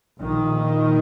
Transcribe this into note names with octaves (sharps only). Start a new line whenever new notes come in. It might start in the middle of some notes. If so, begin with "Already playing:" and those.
A#1 A#2 D#3